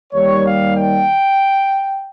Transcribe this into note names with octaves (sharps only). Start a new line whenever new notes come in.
D#2 D#3 G3 C#5
F5
G5